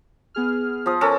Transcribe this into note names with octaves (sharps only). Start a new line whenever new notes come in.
B3 G#4 F6
F3 D#6
C#4 A4 A#4